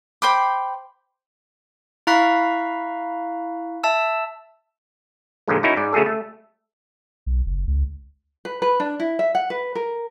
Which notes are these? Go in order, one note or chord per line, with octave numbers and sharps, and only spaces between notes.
C5 G5 B5 D6
E4 F5 A#5 C#6 F#6 B6
E5 A5 E6
D#2 A#2 D3 F3 G#3
C#4 D#4 E4 F#4 A#4 A#5
G#2 D5
C#3 A3 F#4 G#4 A4
A3
B1
F#1
C#2
B4
B4
D4
E4
E5
F#5
B4
A#4